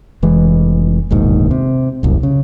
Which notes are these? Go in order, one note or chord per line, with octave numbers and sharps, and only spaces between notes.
F1 E3 G#3
E1 A#1 D#2 G#2
C3
D#1 C2 F#2
C#3